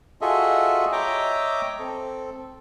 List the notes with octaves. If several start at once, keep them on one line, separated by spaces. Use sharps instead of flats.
F4 F#4 G#4 A4 D#5 E5
C#5 D#5 E5 G5 A#5 D6
C4 A4